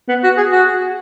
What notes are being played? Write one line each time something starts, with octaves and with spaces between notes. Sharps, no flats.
B3
F#4
G#4
F#4